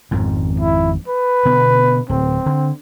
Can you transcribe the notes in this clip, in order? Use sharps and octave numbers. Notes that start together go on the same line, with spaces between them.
G#1 F2 G#2
E4
B4
B2 D3 B3
D1 C4
D3